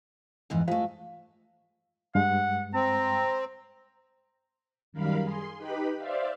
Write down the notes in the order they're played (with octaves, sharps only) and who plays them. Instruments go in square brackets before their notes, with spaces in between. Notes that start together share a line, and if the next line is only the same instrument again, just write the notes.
[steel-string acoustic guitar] F2 G#2 E3
[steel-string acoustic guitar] G#3 A3 [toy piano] F4 C5 F5
[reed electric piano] G2 G#3 [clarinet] F#5
[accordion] C4 [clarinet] A#5
[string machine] F#2 D#3 G3 A#4 F5 B5
G#4 C6
D#4 G4 B4 B5
C5 D5 E5 F5